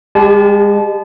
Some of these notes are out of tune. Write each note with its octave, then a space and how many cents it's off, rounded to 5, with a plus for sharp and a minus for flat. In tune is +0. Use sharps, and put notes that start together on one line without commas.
G#3 -35 G4 +10 A5 -30